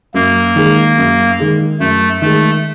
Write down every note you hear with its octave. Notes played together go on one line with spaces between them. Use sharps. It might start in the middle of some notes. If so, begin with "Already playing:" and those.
F#2 A#3
D#3 G#3
F#2
D#3 G#3
F#2 A3
D#3 G#3 A3